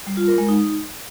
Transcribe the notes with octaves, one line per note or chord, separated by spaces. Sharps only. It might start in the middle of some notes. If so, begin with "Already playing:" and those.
G3
F4
A#4
G#3
D#4